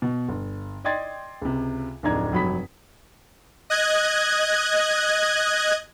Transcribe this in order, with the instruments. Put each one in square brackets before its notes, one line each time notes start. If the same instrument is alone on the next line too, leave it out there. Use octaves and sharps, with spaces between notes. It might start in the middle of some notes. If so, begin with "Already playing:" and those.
[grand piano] B2
G1
D5 D#5 G5 C6 G#6 A6
C#2 C3
D1 F2 D4 D#4 A#5 G#6
F1 G2 F#3 B5 D#6 B6
[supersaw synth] D#5 F#6 G#6